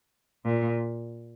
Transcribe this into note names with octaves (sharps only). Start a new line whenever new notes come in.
A#2